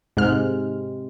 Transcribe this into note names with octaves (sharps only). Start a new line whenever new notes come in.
G#2 C3 G#3 F6